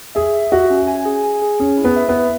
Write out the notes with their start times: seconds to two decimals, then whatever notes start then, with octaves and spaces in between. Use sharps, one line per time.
0.15 G#4 E5
0.34 E5
0.51 F#4 E5
0.70 C#4
0.88 G#5
1.05 G#4
1.24 G#5
1.42 G#4
1.60 C#4 G#4
1.78 E4
1.84 B3
1.96 E5
2.09 B3
2.14 E4